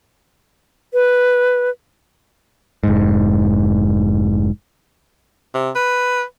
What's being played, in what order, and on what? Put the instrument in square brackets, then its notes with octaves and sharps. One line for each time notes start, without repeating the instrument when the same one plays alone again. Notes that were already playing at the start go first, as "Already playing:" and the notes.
[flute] B4
[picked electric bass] F1 G#2
[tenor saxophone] C3
B4